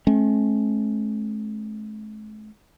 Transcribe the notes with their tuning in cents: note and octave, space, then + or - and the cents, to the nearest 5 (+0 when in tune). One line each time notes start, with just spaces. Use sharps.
A3 -45 C#4 -40